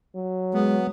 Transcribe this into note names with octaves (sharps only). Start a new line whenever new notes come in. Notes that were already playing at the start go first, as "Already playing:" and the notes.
F#3
G#3 B3